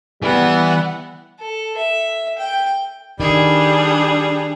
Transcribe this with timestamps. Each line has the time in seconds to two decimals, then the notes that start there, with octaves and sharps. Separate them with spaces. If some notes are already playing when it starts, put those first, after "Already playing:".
0.22 E3 G3 B3 F#5
1.40 A4
1.77 E5
2.38 G5
3.20 D#3 G3 D4 G#4 A4